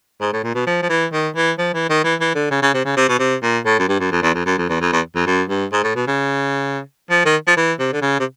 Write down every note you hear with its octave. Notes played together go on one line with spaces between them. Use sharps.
G#2
A2
A#2
B2
F3
F3
E3
D#3
E3
F3
E3
D#3
E3
E3
D3
C#3
C#3
C3
C#3
C3
B2
C3
A#2
A2
F#2
G2
F#2
F2
E2
F2
F#2
F2
E2
F2
E2
F2
F#2
G2
G#2
A2
B2
C#3
F3
D#3
F3
E3
C3
D3
C#3
C3